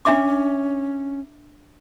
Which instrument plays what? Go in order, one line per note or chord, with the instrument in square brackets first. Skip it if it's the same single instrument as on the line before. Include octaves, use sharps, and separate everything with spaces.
[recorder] C#4 [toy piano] D4 E5 D6